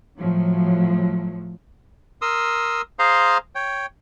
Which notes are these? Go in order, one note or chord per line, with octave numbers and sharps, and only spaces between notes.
A2 F3 F#3
A#4 C6 D#6 E6
G#4 C5 F5 A#5 C6
C#5 G5